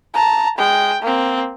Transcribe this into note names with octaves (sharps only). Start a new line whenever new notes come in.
A5 A#5
G#3 G5
A#3 C4